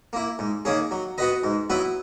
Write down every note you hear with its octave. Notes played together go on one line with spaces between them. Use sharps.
A#3 E4
G#2
D#3 A#3 C#4 G#4
F#3
B3 F#4 B4 D#5
G#2
F#3 B3 E4 B4